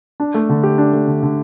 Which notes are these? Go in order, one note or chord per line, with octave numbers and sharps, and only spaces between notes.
D4
A3
D3
G4
D4
A3
D3
D3